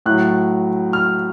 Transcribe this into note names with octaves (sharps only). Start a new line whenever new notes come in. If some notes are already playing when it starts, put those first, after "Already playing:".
A2 F#3 F#6
F6